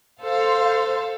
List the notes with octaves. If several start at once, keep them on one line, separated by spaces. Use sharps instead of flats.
A4 C5 F5